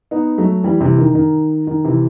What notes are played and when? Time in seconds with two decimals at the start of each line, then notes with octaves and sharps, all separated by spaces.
0.11 B3 D#4
0.38 F#3 A3
0.64 E3 G3
0.81 C3 E3
0.98 D#3
1.15 D#3
1.67 D#3
1.84 C3 E3